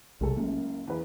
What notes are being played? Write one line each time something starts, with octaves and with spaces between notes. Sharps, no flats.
B1 C3 G3 A3 A4
F#1 C#2 F#2 A#3
E2 B4